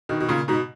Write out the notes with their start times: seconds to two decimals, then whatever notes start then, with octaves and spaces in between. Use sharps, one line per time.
0.09 B2 D#3
0.20 B2
0.29 A#2 C#3
0.48 G#2 B2